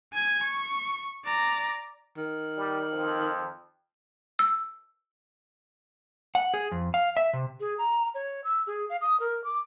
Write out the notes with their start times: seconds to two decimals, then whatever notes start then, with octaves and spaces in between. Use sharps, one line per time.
0.13 G#5 G#6
0.43 C#6
1.25 D5 A#5
2.18 D#3
2.57 G3
2.92 F2
4.39 E6
6.35 F#5
6.54 G#4
6.72 F2
6.94 F5
7.17 E5
7.33 C3
7.60 G#4
7.78 A#5
8.14 C#5
8.44 E6
8.67 G#4
8.89 F5
9.01 D#6
9.20 A#4
9.44 D6